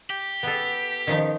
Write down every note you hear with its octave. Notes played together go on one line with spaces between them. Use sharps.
G4
B3 A4
D#3 F3 D#4